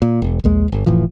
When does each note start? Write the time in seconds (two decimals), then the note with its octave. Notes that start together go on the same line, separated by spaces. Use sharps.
0.02 A#2
0.22 E1
0.44 A#1 D#2 G#3
0.68 D1 G1
0.86 F1 A2 E3 F3